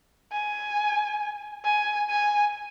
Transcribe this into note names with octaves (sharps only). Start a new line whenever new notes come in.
G#5
G#5
G#5